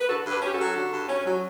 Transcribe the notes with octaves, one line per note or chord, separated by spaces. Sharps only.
B4
D3 F#4 A4
G2
G4 B4
C#4 G4
F#4 A4
F#3
D3
G2
C#4
F#3